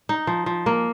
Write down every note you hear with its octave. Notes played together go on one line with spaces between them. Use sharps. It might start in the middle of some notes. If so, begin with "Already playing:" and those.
D#4
F3
F3
A#3